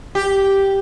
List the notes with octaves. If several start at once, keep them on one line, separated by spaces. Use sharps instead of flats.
G4